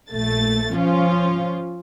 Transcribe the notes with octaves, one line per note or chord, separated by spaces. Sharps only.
A#1 A3 A6
F3 C#4 F4